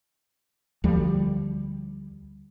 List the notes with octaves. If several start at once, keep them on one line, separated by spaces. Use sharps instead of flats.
D2 F3 G3